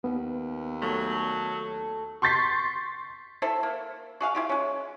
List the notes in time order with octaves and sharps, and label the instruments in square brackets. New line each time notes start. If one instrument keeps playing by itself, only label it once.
[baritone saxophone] D#2 [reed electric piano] B3
[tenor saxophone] F#3 [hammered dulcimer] A3
[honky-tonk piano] C6 C#6 G6 A6 B6 C7
[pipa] E4 A4 C5 E5
A#3
F#4 G#4 F5
E4 F4 G4
G#3 C#4